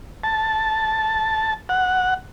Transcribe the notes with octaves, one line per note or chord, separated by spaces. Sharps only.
A5
F#5